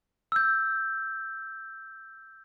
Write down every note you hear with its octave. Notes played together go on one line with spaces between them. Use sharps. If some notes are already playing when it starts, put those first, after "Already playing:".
E6 G6